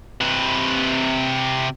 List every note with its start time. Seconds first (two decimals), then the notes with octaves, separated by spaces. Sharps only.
0.21 C3 B4